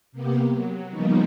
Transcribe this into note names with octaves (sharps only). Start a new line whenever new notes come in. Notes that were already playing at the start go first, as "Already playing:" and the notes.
C3 A#3 B3 G4
F#3
C#3 F3 G3 A#3 B3 D#4